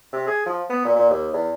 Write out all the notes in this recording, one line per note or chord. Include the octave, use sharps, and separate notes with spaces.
C3
G#4
F3
B3
A#2
A#2
D#2
E2